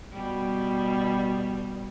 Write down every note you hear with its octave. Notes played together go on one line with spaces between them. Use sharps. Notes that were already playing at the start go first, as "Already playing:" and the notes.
B2 G3